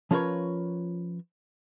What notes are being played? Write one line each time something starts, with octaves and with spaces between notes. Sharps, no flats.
F3 C#4 F4 A#4 B4 C#5